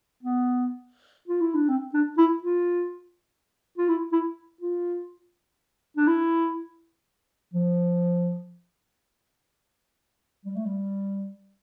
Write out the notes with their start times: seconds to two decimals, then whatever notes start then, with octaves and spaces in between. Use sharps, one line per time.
0.22 B3
1.27 F4
1.41 E4
1.54 D4
1.68 C4
1.93 D4
2.17 E4
2.42 F4
3.78 F4
3.88 E4
4.12 E4
4.61 F4
5.96 D4
6.07 E4
7.54 F3
10.45 G3
10.56 A3
10.65 G3